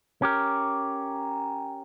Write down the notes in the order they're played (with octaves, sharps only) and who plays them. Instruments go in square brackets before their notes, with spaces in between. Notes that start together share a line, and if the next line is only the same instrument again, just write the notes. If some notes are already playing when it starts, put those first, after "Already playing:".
[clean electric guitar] C#4 G4 A#4